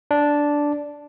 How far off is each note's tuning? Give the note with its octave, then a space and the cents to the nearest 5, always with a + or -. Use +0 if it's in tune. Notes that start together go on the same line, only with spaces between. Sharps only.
D4 -5